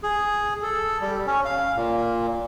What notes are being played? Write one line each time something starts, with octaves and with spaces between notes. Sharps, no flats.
G#4
A4
G3
C#4
F5
A#2